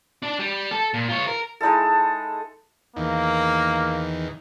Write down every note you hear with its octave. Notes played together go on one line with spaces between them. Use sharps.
D4 D5
G3
A4
A#2
F4 C#5
A#4
G#3 D#4 E4 A4
E2 D#3 A#3